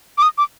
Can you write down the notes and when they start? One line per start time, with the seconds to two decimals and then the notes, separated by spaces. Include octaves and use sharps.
0.18 D6
0.22 D#6
0.38 D6